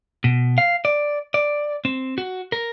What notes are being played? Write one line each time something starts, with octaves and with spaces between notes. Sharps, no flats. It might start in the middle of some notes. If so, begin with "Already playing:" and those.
B2
F5
D5
D5
C4
F#4
A#4